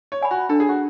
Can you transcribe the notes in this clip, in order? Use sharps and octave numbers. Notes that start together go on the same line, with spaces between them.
C#5
D5 G#5 B5
F#4
D4 A4
G#4
F#4